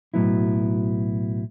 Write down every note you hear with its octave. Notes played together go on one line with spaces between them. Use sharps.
B1 A2 F#3 B3 E4